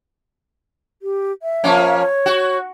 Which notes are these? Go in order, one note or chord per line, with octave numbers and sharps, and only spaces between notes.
G4
E5
F3 A#3 C#4
C#5
F#4